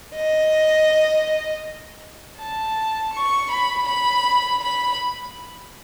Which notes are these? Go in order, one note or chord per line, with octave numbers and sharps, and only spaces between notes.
D#5
A5
C#6
B5
B5
B5